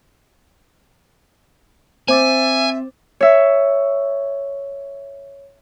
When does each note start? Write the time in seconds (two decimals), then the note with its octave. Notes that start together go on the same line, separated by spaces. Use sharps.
2.08 C4 C5 E5 G#5 D6 A6
3.21 C#5 E5